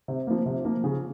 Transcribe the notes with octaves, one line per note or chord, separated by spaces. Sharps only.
C3
F3 A#3
C3
F3 A#3
C#3